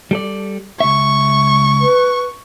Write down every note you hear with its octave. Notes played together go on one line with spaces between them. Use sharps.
G3 A4 D5
C#2 E5 C#6
B4